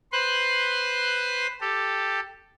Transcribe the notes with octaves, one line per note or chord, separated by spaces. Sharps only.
B4 C5 C6 F#6
G4 A4